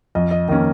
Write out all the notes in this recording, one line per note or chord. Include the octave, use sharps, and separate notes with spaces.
F2 D#5
D#5
D#3 A#3 C#4 D#5